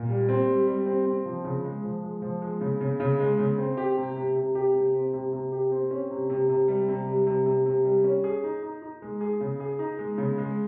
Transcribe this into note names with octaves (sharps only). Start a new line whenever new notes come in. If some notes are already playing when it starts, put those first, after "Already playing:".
Already playing: A#2
G3
C4
G3
G3
C4
C4
F3
C#3
G#3
F3
G#3
F3
G#3
C#3
C#3
C#3
G#3
C#3
C4
G4
C3
C3
C3
G4
C3
C4
C3
C3
G4
C4
C#4
C3
C3
C3
G3
C3
G3
C3
C3
C3
G3
C#4
G#4
D#4
D#4
D#4
G#3
G#4
C#3
G#4
D#4
G#3
C#3
G#3